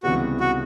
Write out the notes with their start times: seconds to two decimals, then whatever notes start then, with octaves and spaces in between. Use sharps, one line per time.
0.03 C#2 C3 E3 G3 B3 F#4
0.40 F#4